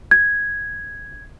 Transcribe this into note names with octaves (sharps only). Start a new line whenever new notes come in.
G#6